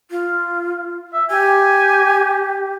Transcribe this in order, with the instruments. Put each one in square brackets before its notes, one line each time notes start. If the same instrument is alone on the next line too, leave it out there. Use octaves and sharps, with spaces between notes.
[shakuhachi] F4
[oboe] E5
[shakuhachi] G4 [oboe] G#5